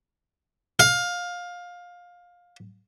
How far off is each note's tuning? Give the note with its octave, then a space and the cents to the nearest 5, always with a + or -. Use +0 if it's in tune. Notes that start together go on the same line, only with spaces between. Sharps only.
F5 +20